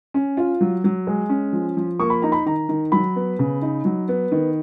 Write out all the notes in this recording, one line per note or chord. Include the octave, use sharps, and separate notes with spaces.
C#4
F4
F#3
F#3
G#3
C#4
F3
F3
A#3 C#6
B5
D#4 A#5
B5
D#3 A#5
D#3
F#3 B5
B3
C#3
D#4
F#3
B3
D#3